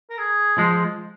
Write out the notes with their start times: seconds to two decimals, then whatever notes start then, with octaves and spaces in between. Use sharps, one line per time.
0.10 A#4
0.18 G#4
0.58 F3 G#3